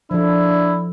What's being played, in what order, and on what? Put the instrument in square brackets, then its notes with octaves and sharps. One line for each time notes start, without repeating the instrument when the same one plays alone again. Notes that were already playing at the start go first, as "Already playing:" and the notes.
[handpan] F3 A4 [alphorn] D4 [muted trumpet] E4